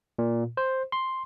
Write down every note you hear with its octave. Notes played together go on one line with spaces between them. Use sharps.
A#2
C5
C6